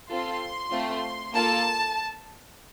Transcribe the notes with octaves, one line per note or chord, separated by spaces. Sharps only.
C4 F4 A4 C6
A3 C4 F4
A#3 F4 A4 A5